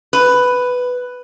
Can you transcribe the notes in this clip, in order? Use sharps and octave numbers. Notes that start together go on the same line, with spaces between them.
B4